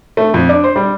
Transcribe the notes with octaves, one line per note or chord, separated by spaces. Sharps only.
A3
F2
D4
C5
G3